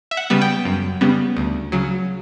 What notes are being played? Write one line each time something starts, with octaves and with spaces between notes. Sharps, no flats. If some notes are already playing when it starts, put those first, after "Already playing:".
E5
F#5
C#3 G3 B3
G5
F#2
C#3 G3 B3
D2
C#3 F#3